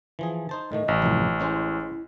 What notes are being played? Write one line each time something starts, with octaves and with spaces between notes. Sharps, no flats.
E3 F3 G#4
D#4 C5 A5
A2 D#3 A3 D#5
A1 E4
C2 F#2 A2 F3
G#3 C#4 E4 C5